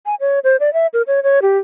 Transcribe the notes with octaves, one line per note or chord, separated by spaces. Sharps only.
G#5
C#5
C5
D5
E5
A#4
C#5
C#5
G4